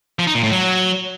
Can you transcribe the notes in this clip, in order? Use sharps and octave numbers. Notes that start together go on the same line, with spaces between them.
F3
D#4
A#2
A2
F#3